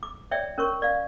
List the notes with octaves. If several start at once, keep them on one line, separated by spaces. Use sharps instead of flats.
D6
C#5 D5 E5 G5
C#4 A#4 C#5 C6 C#6
D5 F5